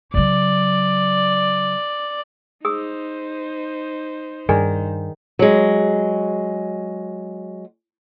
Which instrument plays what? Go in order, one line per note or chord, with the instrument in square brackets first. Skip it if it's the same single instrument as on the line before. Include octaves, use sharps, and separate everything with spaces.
[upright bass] C#3 F#3 [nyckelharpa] D5
[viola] D#4 C5 [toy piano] G#4 D#6 E6
[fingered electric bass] G2 [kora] D#3 [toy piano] G#4 D5 G#5
[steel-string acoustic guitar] F#3 G#3